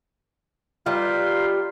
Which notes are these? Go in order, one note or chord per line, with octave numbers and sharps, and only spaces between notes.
G3 D#4 F4 B4 C6